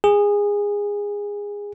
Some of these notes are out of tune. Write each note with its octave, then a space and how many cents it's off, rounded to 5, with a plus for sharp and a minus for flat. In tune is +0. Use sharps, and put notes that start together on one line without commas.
G#4 -20